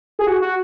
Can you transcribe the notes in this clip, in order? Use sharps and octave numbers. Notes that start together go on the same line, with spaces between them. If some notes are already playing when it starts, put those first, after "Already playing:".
G#4
F#4
F#4